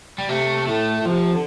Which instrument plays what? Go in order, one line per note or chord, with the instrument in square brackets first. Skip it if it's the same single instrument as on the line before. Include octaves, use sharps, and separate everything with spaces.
[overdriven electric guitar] G3
[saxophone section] C3 [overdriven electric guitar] A3
[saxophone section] A2 [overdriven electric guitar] A3
[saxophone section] A2
[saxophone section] C3 [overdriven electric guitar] F3
[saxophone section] D3